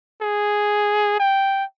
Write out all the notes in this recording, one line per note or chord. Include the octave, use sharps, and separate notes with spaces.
G#4
G5